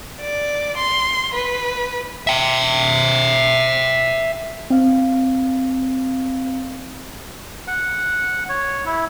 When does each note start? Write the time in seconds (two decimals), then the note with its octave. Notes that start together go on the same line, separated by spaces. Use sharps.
0.20 D5
0.77 C6
1.34 B4
2.27 E5 G5
4.70 C4 F5
7.68 F#5
8.49 C#5
8.86 E4